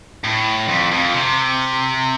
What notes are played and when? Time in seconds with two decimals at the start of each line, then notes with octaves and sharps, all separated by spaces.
0.24 A2
0.68 F2
0.91 F2
1.14 C3